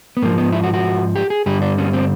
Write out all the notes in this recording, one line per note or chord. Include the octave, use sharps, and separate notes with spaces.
B3
G#2 F3 A#3
B3
E4
F#4
F#4
G4
G#4
G2 D3 G3 G4
D4
C#4
C4